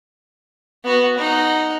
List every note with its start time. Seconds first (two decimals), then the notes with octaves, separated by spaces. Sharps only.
0.84 B3 F#4
1.18 D#4 F#5